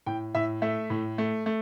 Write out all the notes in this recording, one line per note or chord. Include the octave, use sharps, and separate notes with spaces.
A2 G5
A2 E5
A3 E5
A2
A3
A3